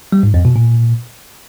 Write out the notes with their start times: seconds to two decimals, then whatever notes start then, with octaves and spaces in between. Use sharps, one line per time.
0.12 G3
0.23 G#2
0.34 F2
0.45 B2
0.56 A#2